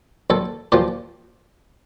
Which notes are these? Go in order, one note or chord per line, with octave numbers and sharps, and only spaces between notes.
A#1 A4
A#2 F3 G4